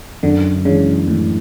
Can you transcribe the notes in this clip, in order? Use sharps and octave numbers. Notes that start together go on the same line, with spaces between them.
F#2 D3
C#3 E3 G#3 D4
F#2 A2